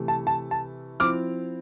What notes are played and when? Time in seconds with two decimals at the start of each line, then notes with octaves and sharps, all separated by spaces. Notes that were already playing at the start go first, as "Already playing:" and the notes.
Already playing: C3 E3 A3 E4
0.08 A5
0.27 A5
0.51 A5
0.99 F3 C4 E4 D6 F6